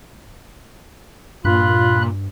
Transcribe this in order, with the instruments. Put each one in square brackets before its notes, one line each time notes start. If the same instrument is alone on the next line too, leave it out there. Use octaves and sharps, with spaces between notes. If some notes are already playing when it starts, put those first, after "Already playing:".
[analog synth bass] G2 [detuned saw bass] A#2 [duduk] F4 [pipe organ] B5 F#6